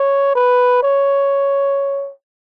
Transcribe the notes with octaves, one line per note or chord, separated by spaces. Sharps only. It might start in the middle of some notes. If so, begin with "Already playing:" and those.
Already playing: C#5
B4
C#5